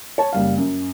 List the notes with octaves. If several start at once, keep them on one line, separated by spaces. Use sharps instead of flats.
C#5 A5
F#1 G3 F5
F#2